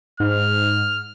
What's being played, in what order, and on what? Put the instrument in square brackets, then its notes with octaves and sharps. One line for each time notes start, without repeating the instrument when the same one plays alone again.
[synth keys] G#2 [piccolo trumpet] F6